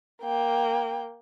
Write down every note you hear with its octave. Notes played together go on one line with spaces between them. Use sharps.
A#3 G5